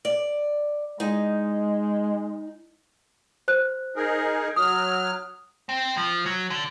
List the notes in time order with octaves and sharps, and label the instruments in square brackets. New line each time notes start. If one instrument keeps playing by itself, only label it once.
[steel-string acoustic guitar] D5
[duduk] G#3 [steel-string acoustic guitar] D#4
[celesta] C5 F#6
[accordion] D#4 G#4 A#4
[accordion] F#3 F6 [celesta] D#6
[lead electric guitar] C4
F3
F#3
D3